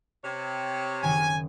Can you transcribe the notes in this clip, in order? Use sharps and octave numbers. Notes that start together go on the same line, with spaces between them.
C3 C#5
F#1 D#3 G#5